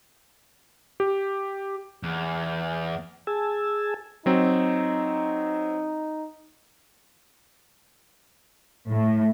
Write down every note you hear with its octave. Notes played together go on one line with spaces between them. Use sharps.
G4
E2
G#4 G#5 A5 E6
F#3 C4 D#4
A2